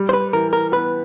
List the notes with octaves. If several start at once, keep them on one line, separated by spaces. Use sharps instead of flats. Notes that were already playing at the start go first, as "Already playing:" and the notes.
Already playing: G3
C5
B4
E3 A#4
A#4
B3 B4